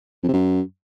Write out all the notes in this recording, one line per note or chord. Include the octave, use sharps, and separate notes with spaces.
F2
C3
F#2